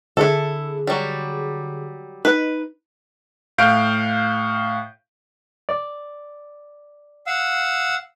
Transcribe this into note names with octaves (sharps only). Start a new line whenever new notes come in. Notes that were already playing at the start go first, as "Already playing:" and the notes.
D3 E4 G#4 A4
F#3 G3
D#4 B4
A2 F5 G6 D7
D5
F5 F#5 E6